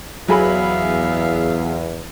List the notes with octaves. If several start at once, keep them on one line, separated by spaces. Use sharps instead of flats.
E2 F#3 B3 G#4 E5 F5 B5